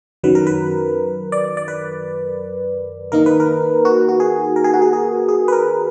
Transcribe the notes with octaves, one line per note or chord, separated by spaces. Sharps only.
F#2 D#3 F#3 B4
A#4
B4
D5
D5
B4
D#3 A#3 D#4 A#4
B4
A#4
F#4
F#4
G#4
A#4
G#4
F#4
G#4
G#4
G#4
B4
A#4